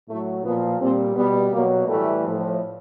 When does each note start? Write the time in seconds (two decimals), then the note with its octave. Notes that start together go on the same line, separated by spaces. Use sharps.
0.09 A2 F#3 A3
0.44 A#2 F3 B3
0.81 A#2 G3 C4
1.16 B2 G3 B3
1.52 B2 F#3 A#3
1.88 A2 E3 G3 A3
2.24 A2 F3